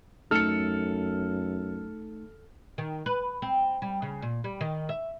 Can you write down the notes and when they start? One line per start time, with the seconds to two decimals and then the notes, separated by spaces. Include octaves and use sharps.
0.31 F#2 A3 D#4 A4 F6 C#7
2.78 D#3
3.06 B4
3.42 C4
3.82 G3
4.02 C#3
4.22 A#2
4.44 G3
4.61 D#3
4.89 E5